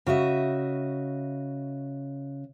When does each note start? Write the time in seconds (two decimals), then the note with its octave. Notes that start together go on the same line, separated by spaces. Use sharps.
0.06 C#3 F#4 D#5 E5